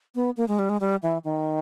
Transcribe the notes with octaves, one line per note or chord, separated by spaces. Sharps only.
B3
A#3
G#3
G3
G#3
G3
E3
D#3